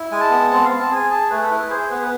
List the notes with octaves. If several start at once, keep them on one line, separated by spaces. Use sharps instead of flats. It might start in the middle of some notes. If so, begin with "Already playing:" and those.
Already playing: E4
G#3 G#5
A5
B3
C4 A5
C4 F5
A5
G#4 G#5
G#4 A5
A3 B4
A4
E4 B4
G#4 C5
B3 B4
B4